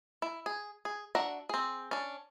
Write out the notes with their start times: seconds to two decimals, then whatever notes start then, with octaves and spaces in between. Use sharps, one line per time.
0.22 E4
0.46 G#4
0.85 G#4
1.15 D4 F#4 E5 F#5 A#5
1.49 C4 G#4
1.91 C#4 D4